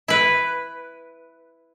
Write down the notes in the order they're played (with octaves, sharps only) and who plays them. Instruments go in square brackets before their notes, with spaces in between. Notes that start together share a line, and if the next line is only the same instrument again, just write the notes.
[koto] E4 B4